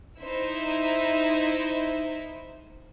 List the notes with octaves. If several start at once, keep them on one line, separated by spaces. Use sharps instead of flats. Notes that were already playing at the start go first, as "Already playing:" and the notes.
D#4 E4 C5 E5